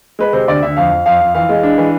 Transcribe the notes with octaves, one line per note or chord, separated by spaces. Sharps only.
G#3 B4
C3 C5
D2 D5
D2 E5
F2 F5
F2
F2 F5
F2
E3 F5
G#3
D4
E3